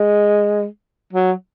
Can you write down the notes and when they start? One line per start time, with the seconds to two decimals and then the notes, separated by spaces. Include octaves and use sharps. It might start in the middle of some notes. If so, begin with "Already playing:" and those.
Already playing: G#3
1.13 F#3